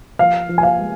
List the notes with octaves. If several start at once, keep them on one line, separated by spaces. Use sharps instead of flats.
F3 F5
F3
G#5
F5
G#3